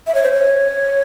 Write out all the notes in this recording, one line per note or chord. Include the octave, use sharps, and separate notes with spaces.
E5
C#5
C5
C#5